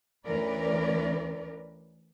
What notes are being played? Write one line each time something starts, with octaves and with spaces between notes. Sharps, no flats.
D2 E3 C#4 A#4 B4 D5